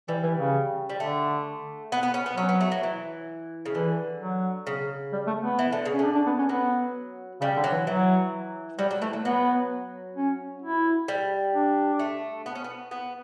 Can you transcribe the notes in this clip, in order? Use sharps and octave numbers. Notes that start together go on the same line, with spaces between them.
E3 G3
E3
C#3
G3
D3 A3
B3
B3
C#4
B3
F#3 C#4
B3
A3
F#3
E3
C#3
D3 E3
F#3
C#3
G3
A3
B3
E3
D3
C#3
C#4
D3
D4
D4
B3
C#4
F#3 B3
C#3 G3
D3
F#3
E3
E3 F#3
F#3 G3
F#3
E3 A3
F#3
F#3 B3
C#4
E4
G3
D4
A3
B3
C#4
B3
B3